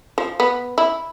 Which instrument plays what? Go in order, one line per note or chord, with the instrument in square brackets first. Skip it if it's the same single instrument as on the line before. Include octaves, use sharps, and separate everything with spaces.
[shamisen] F3
B3
E4